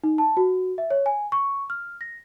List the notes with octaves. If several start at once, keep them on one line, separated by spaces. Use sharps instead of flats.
D#4
A5
F#4
E5
C#5
G#5
C#6
F6
A#6